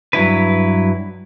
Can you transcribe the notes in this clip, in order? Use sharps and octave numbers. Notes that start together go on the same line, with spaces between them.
G2 F#3 E4 B4